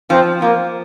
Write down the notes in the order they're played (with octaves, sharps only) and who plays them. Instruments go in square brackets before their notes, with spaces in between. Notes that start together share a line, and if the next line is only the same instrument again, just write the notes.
[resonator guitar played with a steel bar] F3 [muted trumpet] C4
[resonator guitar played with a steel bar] F3 [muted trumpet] A#3